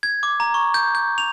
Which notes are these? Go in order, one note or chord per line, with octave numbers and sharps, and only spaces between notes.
G#6
D6
A#5
C#6
G6
G6
F7